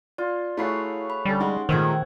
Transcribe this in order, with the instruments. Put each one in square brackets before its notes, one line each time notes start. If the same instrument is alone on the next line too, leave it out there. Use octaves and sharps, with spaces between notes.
[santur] F4 [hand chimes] D5
[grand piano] A3 G#4 [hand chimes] E4 B5 C7 [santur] F#4 C#5 F5
[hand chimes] B5
[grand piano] D3 A4 [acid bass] G3 [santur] C#4 G4
[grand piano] G#3 [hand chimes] D#4 F#5 C6
[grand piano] A#2 G#3 A3 [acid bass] D#3 [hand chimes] C5 E6 G#6